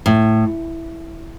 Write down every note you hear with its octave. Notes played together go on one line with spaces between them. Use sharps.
A2